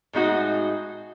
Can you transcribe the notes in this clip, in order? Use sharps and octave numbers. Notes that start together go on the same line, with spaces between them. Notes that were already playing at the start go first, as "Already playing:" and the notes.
A2 G#3 D#4 F#4